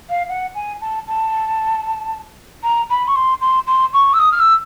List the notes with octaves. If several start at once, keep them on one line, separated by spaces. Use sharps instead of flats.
F5
F#5
G#5
A5
A5
A#5
B5
C#6
C6
C6
C6
C#6
E6
D#6
F6
E6